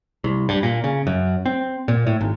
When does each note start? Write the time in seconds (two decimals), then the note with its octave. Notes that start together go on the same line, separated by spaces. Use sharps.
0.24 C2
0.49 G2
0.63 A#2
0.84 C#3
1.07 F#2
1.46 C4
1.88 A#2
2.07 A2
2.21 G#1